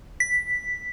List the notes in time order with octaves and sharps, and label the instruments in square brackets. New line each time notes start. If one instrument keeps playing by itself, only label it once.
[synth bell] B6